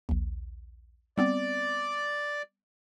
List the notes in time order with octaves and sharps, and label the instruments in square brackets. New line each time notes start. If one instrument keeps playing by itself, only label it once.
[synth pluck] A#1 D#2
[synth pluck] G3 B3 C4 [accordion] D5